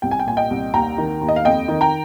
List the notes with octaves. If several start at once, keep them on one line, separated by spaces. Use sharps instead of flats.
C2 G5
G#5
G5
A#2 G#5
D#5 G5
C2
D#2 G5 A#5
D#3
D#2
D#5
F5
F2 D#5 G5
D#3
G5 A#5